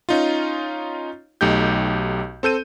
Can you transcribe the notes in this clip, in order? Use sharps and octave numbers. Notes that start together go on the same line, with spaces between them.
C#4 D#4 F4
B1 A3 D#4 G4 G6
C4 A4 G6 D#7